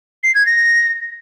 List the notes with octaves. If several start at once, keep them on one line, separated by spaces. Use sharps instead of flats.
C7
G#6
A#6